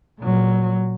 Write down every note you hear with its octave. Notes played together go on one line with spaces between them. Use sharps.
A#2 F#3